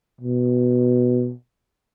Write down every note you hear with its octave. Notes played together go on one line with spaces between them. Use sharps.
B2